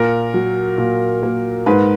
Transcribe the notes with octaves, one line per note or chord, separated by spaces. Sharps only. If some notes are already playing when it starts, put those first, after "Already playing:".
Already playing: A#2 A#4
F#3
A#2
A#3
G#2 B4